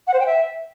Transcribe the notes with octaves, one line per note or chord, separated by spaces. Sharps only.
F#5
C5
G5
E5